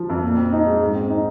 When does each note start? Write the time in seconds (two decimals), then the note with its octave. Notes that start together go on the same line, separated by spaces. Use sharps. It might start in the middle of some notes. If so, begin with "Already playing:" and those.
Already playing: F3
0.09 F2
0.23 A#2
0.37 C4
0.52 D#4
0.66 G#3
0.80 G#2
0.95 C4
1.10 D#4